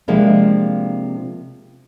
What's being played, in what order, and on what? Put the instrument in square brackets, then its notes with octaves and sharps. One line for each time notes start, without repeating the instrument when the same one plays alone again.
[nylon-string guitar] C3 F3 G#3 A#3 D4